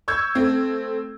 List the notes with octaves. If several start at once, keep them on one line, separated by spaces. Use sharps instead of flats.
C#6 E6 G6 G#6
A3 C4